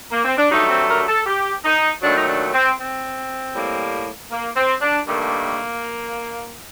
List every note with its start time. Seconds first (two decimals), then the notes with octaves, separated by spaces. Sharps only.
0.10 A#3
0.24 C4
0.37 D4
0.50 G2 F#3 A3 D#4
0.69 C4
0.88 A#4
1.08 A4
1.26 G4
1.64 D#4
2.02 D#2 D#3 F#3 A3 D4
2.17 D#4
2.27 D4
2.53 C4
2.79 C4
3.54 A2 G3 A#3
4.31 A#3
4.56 C4
4.81 D4
5.07 G2 D#3 A3 A#3